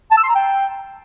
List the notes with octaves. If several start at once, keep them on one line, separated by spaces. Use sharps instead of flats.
A5
E6
C6
A#5
G5